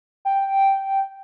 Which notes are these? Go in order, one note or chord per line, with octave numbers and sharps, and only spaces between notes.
G5